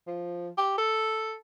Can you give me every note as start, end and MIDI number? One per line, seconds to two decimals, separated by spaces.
0.07 0.49 53
0.58 0.74 67
0.78 1.34 69